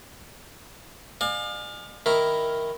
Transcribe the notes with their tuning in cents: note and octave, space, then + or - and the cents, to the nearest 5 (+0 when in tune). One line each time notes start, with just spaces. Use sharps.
D5 +45 F5 +25 G#5 +5
D#3 +0 E4 +0 A#4 +0